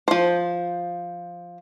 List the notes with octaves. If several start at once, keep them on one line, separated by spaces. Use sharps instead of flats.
F3 C5